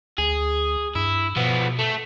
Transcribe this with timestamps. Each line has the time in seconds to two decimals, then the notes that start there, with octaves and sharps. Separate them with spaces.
0.18 D2 G#4
0.96 G2 E4
1.36 B2 F3 B3
1.79 A3